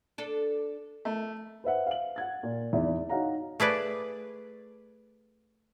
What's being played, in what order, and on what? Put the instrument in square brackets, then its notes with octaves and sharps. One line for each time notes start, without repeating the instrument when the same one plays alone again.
[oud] D4 A4
[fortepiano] A3
[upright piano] B4 C5 E5 F#5
F5 F#7
F#5 G#6 A6
A#2
G#1 E2 E4 D5 E5
D#4 F#4 C#5 F5 F#5 A#5
[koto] A3 G#4 B4 D5